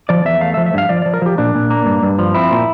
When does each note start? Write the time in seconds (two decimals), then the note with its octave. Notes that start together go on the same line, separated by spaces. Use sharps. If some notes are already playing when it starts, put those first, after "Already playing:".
0.09 F3 D5
0.25 E2 E5
0.41 A3 F5
0.54 E5
0.57 F3
0.66 E5
0.74 G2 F5
0.89 F3 D5
1.02 F3 D5
1.14 A#4
1.22 F3 G4
1.38 A#2 D4
1.55 A#2
1.70 A#3
1.86 G2
2.03 G2
2.19 F3
2.35 C4 E4
2.51 A#2